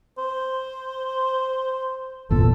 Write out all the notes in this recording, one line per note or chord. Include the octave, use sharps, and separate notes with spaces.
C5
G1 E2 A#2 A4